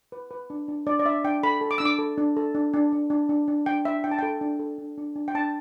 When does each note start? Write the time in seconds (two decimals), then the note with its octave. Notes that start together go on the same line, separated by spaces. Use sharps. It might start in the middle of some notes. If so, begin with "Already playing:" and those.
0.12 B4
0.31 B4
0.50 D4
0.68 D4
0.87 D4 D5
0.99 D5
1.05 D4 E5
1.25 D4 G5
1.43 A4 B5
1.61 A4
1.71 D6
1.78 D4 E6
1.85 D6
1.99 A4
2.18 D4
2.37 A4
2.55 D4
2.74 D4
2.92 D4
3.10 D4
3.29 D4
3.48 D4
3.66 D4 G5
3.85 D4 E5
4.04 D4 G5
4.11 A5
4.19 A4 G5
4.41 D4
4.59 A4
4.78 D4
4.98 D4
5.16 D4
5.28 G5
5.35 D4 A5